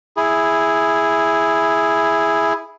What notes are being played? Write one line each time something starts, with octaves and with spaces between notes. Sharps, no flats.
E4 G#4